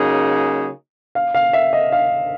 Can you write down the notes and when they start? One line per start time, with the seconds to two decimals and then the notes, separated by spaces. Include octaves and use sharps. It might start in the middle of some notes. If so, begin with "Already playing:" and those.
Already playing: C#3 F#3 A#3 D#4 G#4
1.15 F5
1.35 F5
1.53 E5
1.73 D#5
1.92 F5